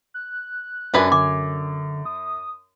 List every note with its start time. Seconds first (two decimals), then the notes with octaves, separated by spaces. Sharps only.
0.14 F#6
0.94 F#2 D4 B4 G#5
1.12 D3 G#5 D6
2.05 D#6